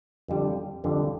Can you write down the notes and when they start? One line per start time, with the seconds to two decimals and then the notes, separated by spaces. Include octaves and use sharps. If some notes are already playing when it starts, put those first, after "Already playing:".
0.28 F2 D3 G3
0.84 F2 D3 G3